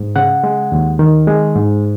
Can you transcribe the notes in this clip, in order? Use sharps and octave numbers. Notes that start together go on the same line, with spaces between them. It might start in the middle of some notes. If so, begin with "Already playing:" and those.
Already playing: G#2
C#3 F#5
G#3
D#2
D#3
G#3
G#2